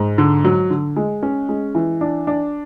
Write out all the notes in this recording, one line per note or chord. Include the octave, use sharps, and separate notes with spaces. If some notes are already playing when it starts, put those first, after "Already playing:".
Already playing: G#2
D3
F#3
D3
G#3
C#4
G#3
E3
D4
D4